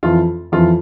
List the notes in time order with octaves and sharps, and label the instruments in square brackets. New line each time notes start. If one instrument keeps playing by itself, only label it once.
[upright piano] F2 E3 F4
F2 E3 F4